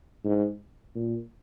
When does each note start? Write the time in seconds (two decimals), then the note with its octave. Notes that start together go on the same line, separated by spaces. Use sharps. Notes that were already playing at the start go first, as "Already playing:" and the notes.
0.24 G#2
0.95 A#2